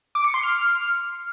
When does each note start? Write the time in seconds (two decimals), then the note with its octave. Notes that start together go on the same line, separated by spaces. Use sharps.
0.15 D6
0.24 C#7
0.34 C6
0.43 F6